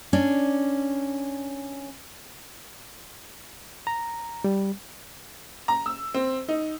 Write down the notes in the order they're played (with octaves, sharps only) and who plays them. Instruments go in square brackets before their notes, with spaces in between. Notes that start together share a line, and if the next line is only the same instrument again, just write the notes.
[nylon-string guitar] C#4 D4 D5
[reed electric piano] A#5
G3
[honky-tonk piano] A#5
E6
C4
D#4